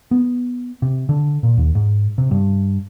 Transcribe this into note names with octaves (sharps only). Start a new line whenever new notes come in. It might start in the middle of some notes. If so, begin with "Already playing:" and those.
B3
C3
D3
A#2
D#2
G#2
C3
G2